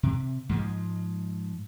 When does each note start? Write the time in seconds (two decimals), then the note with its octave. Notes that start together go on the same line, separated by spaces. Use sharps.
0.03 C3
0.49 G#2 F3 G#3